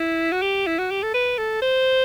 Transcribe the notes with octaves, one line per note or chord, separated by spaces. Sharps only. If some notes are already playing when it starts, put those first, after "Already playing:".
Already playing: E4
F#4
G4
E4
F#4
G4
A4
B4
A4
C5